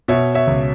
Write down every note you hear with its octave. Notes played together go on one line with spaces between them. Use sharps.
B2 C#5 E5
C#5 E5
C#2